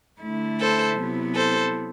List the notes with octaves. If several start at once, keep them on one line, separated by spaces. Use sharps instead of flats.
D3 A3 E4
A4 C5
C3 F#3 B3 E4
A4 C5